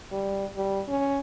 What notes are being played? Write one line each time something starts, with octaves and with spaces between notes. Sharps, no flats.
G3
G3
C#4